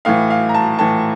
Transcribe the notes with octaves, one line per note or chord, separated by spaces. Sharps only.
A2 E3 F5
F5
A#5
A5
A2 E3 A5